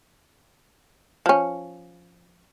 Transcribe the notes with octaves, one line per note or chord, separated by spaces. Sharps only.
F3 C#4